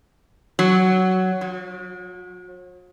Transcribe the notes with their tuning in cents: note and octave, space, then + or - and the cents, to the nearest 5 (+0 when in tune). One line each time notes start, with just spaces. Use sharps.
F#3 +10
F#3 -45